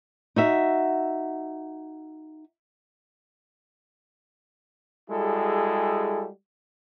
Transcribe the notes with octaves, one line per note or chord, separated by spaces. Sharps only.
D#4 F#4 E5
G3 G#3 E4 F#4 G#4 A4